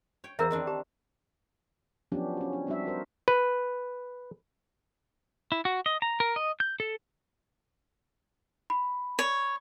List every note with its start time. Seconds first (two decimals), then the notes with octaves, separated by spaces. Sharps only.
0.24 C#5 G5
0.39 E2 A#4 C5 E5 F5 A#5 E6
0.51 D#3 C4 D4 A#4 D#5
0.67 G4 A5
2.12 F3 F#3 B3 C#4 D4 G4
2.37 C#4 F#4
2.53 D4
2.67 G3 C4 D4 D#4 F#4 E5
2.86 F#4 A#4 C5
3.28 B4
5.52 E4
5.65 F#4
5.86 D#5
6.02 A#5
6.20 A#4
6.36 D#5
6.60 G6
6.80 A4
8.70 B5
9.19 C#5